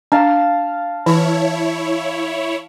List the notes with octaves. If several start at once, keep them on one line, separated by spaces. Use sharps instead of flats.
D4 F5 A5 A#5
E3 E4 C#5